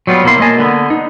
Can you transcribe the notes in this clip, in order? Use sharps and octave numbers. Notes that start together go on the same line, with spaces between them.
F#3 G3 B3 F4
B2 A#3 E4 C6
A#3 D#5 G#5 A5
D3 B3
D#4